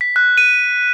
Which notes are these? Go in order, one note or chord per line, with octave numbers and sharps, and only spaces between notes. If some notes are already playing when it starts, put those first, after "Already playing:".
B6
F#6
D#7